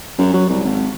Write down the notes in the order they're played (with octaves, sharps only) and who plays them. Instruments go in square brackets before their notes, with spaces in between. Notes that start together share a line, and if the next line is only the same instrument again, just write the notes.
[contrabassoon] F#2
F#3
C2
G#1